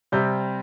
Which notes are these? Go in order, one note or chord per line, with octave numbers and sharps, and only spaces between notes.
C3 G3 C4 G6